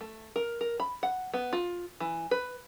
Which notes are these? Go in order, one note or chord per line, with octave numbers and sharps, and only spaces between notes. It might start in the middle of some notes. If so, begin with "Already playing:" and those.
A3
A#4
A#4
B5
F#5
B3
F4
E3
B4